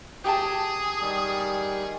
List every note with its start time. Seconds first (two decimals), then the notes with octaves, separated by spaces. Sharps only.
0.24 G4 G#4 G5 A5 D#6
1.01 D#3 G3